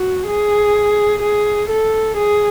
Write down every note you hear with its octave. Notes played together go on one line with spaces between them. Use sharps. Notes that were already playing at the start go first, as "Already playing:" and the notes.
Already playing: F#4
G#4
G#4
A4
G#4